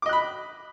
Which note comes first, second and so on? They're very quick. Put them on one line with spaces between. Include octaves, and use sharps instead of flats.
D6 D#5 F#6 B5